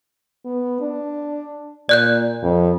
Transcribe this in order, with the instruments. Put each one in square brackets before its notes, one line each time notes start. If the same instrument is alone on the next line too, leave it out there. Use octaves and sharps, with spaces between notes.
[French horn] B3
D4
[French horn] A#2 [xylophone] D5 F#6 G6
[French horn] F2